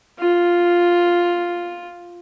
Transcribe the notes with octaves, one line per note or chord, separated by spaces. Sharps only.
F4